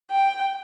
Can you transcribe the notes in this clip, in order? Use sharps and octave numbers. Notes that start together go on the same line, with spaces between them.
G5